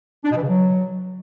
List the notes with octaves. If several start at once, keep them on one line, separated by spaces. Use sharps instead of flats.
D4
B2
E3
C#3
F#3